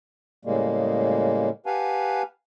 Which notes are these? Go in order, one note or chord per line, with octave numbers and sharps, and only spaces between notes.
A2 C#3 G3 G#3 A#3
G4 B4 F5 F#5 G#5 A5